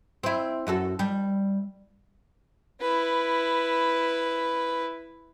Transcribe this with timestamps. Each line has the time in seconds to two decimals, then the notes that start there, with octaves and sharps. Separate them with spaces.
0.23 C4 E4
0.67 F#2 F#4 A4
0.99 G3
2.81 E4 B4